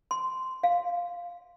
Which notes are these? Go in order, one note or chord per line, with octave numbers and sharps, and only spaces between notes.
C6
F5